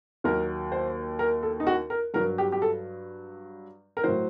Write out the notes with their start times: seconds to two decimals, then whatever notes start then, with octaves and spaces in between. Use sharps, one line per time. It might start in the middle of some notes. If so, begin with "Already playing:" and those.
0.24 D#2 D#3 F#3 A#4
0.72 C5
1.19 A#4
1.43 A4
1.60 D#4
1.67 F#4
1.90 A#4
2.14 G2 F#3 A#4
2.38 G4
2.52 G4
2.62 A4
3.97 A#4
4.04 A2 F#3 C5